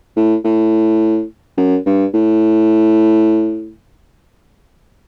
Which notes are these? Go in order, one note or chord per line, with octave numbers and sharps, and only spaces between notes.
A2
A2
F#2
G2
A2